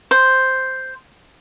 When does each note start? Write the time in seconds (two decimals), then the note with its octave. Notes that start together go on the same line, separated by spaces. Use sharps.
0.11 C5